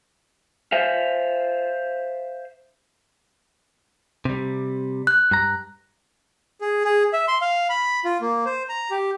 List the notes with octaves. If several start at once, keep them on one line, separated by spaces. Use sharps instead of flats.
C5 E5 F5
C3 G3
F#6
G2 A#5
G#4
G#4
E5
C6
F5
B5
F4
A#3
C5
A#5
G4